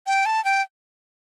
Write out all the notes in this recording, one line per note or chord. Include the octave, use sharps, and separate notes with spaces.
G5
A5
G5